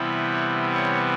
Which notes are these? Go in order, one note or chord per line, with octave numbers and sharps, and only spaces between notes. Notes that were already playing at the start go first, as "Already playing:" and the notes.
Already playing: C3 E3 G3 B3 E4
C#5
C#5